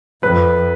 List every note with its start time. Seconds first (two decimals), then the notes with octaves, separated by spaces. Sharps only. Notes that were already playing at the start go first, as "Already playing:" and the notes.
0.23 F2 B4